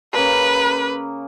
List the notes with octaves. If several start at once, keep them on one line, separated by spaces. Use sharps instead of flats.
C#3 A#3 A#4 B4